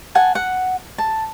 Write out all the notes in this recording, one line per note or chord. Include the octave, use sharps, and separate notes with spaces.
F#5 G#5 A5
F#5
A5